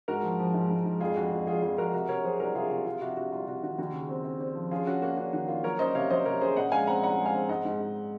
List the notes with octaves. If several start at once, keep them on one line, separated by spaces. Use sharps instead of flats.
G#2 F#4 A#4
F3
F3
G#2
G#2
G#2
F2 F4 G#4
F2 F#4
F2 F#4
F2 F4 G#4
F2 F4 G#4
F2 F#4 A#4
C3 F#4 A#4
C3 A#4 C#5
F#3 G#4 C5
C2 F#4 A#4
C3 F4 G#4
C3 F4
C3 F4
C3 F#4
C3 F#4
C2 F4
C3 F#4
D#3 F#4
D#2 F#4
C#3
C4
C4
C4
F3
C#4 F4 G#4
C#4 F#4
A#3 F#4
C#4 F#4
D#3 F#4
A#3 F4
F#3 A#4 C#5
C#4 C5 D#5
C3 C#5 F5
F#3 C5 D#5
C3 A#4 C#5
C#4 G#4 C5
A#2 D#5 F#5
G#3 F5 G#5
C4 F#5 A#5
C2 F#5 A#5
G#3
F5 G#5
C4
G#2 D#5 F#5
G#2
G#2